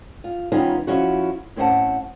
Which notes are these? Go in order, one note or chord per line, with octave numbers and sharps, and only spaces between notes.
F4
D#3 G3 B3 C#4 D#4 F4
F3 C#4 E4 F#4
A2 C4 C#4 G#4 F#5 A5